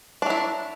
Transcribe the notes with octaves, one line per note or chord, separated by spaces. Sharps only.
F#3 D4 E4